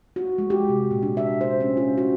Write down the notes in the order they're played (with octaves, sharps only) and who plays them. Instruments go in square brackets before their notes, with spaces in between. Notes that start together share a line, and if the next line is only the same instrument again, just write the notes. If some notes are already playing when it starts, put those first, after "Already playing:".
[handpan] F#4
G#3
G4
C3
A#2
D4
E5
C5
C#4
F4
F#4